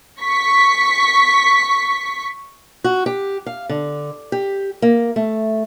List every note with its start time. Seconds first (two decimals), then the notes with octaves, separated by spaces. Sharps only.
0.20 C#6 B6
2.84 F#4
3.06 G4
3.46 F5
3.69 D3
4.32 G4
4.82 A#3
5.16 A3